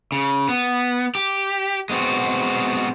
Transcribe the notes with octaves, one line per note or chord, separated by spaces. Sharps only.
C#3
B3
G4
G#3 B3 C4 F#4